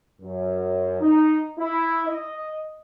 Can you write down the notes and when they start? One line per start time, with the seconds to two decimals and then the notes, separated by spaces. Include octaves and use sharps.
0.22 F#2
1.01 D#4
1.58 E4
2.07 D#5